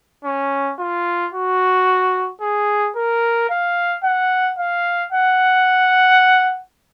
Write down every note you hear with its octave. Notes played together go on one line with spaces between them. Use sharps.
C#4
F4
F#4
G#4
A#4
F5
F#5
F5
F#5